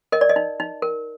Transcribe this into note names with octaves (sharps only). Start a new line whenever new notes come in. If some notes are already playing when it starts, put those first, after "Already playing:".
A#4 D#5
D5
D#5
D#4
D#4
A#4